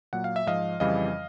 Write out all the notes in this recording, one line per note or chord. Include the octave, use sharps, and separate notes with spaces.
A#2 F#3 F#5
F5
E5
G#2 F3 D#5 F5
F2 C#3 E3 G3 D#5 F5